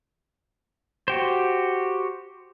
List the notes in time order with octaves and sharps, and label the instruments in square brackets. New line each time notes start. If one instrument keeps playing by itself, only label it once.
[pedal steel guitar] F#4 G4 C5